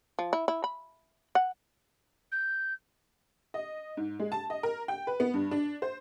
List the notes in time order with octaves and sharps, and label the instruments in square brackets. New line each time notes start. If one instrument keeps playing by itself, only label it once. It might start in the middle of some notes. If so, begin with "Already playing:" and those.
[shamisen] F3
E4
E4
B5
F#5
[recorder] G6
[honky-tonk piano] D#5
G#2
G#3
A5
D#5
A#4
G5
B4
B3
G2
D4
C5